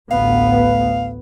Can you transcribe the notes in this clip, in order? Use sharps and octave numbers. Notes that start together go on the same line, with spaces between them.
A1 D2 B3 F5